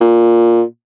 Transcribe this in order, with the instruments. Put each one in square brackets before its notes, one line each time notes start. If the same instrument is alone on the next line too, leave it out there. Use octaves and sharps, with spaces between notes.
[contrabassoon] A#2